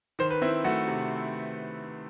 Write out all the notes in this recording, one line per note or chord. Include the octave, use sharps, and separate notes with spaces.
D#3 C5
B4
C4 E4
A3 F#4
C3